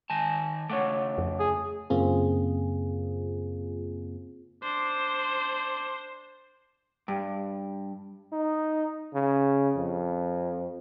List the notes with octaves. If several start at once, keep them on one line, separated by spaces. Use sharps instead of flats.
D#3 G#5 A5
C#3 A3 C#5 F#5 D6
F2
G#4
F#2 C#3 A#3 C4 F4 G#4
D4 C5
G2
D#4
C#3
F2